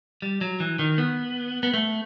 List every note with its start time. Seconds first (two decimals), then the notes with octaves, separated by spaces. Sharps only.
0.22 G3
0.41 F#3
0.60 E3
0.79 D#3
0.98 B3
1.63 B3
1.74 A3